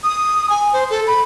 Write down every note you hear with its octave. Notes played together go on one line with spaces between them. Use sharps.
D#6
G#5
C5
A4
B5